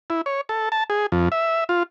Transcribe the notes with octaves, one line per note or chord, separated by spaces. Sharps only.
E4
C#5
A4
A5
G#4
F2
E5
F4